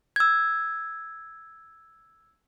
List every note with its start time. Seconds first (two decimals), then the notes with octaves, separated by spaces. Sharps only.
0.16 E6 G#6